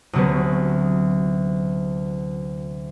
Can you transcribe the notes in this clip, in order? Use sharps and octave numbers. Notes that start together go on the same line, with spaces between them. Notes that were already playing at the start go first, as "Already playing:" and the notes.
D2 C3 F#3 B3 C#4